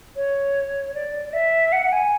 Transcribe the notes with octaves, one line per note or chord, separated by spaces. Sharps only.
C#5
D5
D5
E5
F#5
G#5